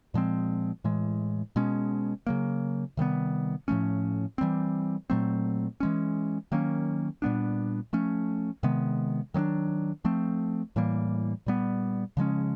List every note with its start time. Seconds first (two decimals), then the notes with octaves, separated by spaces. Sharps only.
0.14 A#2 F3 G#3 C4
0.84 A2 E3 G#3
1.56 B2 G#3 C#4
2.27 C#3 F#3 A#3
2.97 C3 D#3 G3 B3
3.68 A2 F3 A3 C#4
4.38 E3 G3 C4
5.10 A#2 F#3 A3 C4
5.80 E3 G#3 C#4
6.52 D#3 F#3 A#3 C#4
7.22 A#2 G3 B3 D4
7.93 F3 A3 C#4
8.63 C3 D#3 G#3 B3
9.34 D#3 F#3 B3 D4
10.05 F3 A3 C4
10.76 A2 E3 G3 A#3
11.46 A#2 G3 B3
12.17 C#3 F3 G#3 C#4